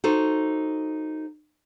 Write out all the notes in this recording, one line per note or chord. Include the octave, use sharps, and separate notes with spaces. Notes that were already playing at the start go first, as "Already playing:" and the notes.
D#4 F#4 A4 C5